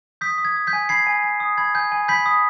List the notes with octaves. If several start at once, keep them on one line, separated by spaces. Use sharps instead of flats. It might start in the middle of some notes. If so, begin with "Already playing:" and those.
D#6 G6 B6
D#6
G#6
D#6
G6 B6
G#5
B5 G#6 C7
G#5
G#5
D#6
B5 G#6
G#5 G6
G#5
B5 G6 B6
D#6